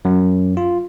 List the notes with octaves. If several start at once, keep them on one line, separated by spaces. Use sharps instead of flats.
F#2
F4